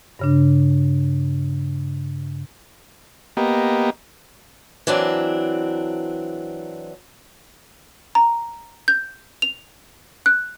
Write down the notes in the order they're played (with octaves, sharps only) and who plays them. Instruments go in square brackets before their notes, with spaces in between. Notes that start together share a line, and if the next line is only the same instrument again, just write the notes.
[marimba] G2 C#3 D4
[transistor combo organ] A#3 B3 G4 D#5
[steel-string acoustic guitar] E3 F#3 C4 D4
[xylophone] A#5
G6
F7
F#6